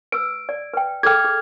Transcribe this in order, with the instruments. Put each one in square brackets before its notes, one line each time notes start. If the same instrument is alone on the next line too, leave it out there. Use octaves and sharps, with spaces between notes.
[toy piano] B4 E6 [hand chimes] D7
[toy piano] D5
B4 G5
[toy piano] G#4 A4 G5 [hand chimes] F6 G#6
[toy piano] G#4